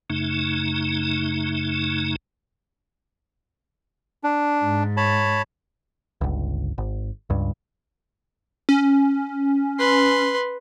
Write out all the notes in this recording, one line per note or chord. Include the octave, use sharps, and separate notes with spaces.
F#2 C#3 A3 D#4
D4
G#2
C#5 A5 B5
G1 C#2
G#1
C#2 G2
C#4
B4 C6